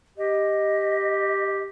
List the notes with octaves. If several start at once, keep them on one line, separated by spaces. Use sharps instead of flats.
G4 D#5